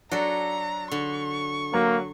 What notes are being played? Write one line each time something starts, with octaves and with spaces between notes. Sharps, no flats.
F#3 D4 F#4 A4 A#5
D3 C#6
F#3 A#3